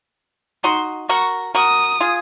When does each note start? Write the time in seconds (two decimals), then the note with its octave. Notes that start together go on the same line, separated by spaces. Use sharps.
0.64 D#4 F#4 C6
1.09 F#4 A#4 C#6
1.55 F#4 A#4 D#6
2.00 F4 G#4